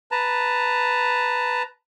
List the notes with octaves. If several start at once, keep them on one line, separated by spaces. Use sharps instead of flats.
B4 A5 A#5